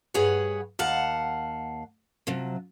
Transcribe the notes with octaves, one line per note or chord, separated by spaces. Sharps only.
G2 G#4 B4 C#5 F#5
D#2 F5 F#5 A5
C3 F3 F#3